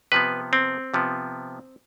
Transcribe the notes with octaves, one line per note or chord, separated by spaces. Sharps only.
C3 F3 B3 B4
C4
C3 F3 B3